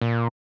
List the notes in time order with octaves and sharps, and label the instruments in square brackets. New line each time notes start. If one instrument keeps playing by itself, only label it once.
[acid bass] A#2